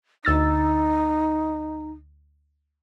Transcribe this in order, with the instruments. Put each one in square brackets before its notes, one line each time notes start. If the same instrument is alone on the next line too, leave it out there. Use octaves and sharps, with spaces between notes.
[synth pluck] D2 E6 A6 [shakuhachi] D#4